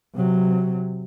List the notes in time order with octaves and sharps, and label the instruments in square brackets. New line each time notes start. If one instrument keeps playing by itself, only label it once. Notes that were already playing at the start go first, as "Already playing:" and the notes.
[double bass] C3 F#3